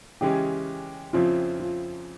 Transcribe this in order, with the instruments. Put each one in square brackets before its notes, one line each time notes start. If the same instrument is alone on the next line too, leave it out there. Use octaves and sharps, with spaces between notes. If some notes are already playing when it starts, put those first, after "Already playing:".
[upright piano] C#3 E3 G#3 C#4 [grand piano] G4
[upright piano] F2 C#3 F3 C4 E4 [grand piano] F4
[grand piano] F4